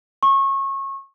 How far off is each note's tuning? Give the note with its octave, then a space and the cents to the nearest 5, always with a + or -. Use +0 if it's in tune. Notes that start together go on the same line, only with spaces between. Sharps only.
C#6 -25